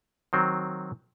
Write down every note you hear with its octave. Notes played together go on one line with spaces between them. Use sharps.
D#3 F#3 C4